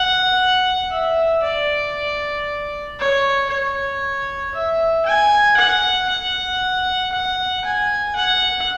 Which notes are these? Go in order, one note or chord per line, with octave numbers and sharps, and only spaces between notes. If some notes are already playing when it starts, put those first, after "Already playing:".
Already playing: F#5
E5
D5
C#5
C#5
E5
G#5
F#5
F#5
F#5
G#5
F#5